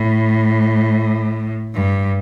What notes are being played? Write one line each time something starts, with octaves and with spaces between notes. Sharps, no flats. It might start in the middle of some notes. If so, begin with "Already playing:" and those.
Already playing: A2
G2